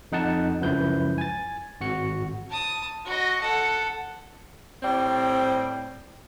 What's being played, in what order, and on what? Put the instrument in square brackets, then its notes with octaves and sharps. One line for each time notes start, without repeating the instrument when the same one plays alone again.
[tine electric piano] F2 D#4 F#5 A5
C#2 F#2 F3 E4 B4 G6
G#5 A6
G#1 F#4 C#7
[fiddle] A5 D#6
F#4 D#5
A4 F#5
[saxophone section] A2 G3 C4